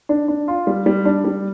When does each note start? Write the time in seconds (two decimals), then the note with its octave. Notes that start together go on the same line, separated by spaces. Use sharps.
0.09 D4
0.28 D4
0.48 F4
0.67 G3
0.86 G3
1.05 D4
1.25 G3